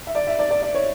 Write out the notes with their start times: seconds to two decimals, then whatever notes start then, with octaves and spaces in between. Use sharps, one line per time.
0.07 E5
0.15 D5
0.27 E5
0.39 D5
0.51 D5
0.62 D5
0.75 C#5